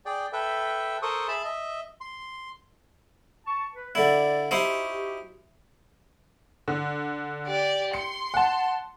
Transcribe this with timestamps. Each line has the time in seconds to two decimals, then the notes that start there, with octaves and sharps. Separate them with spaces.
0.06 G#4 D5 G5
0.33 A4 B4 E5 G5
1.02 A4 A#4 C5 C#6 D#6
1.28 G#4 E5 A5 B5
1.44 D#5 E5
2.01 C6
3.46 A5 C#6
3.74 B4
3.95 D3 E4 D5
4.51 D#4 E4 F#4 G4 C5
6.68 D3
7.47 G4 D5
7.93 C6 C#7
8.34 F#5 A5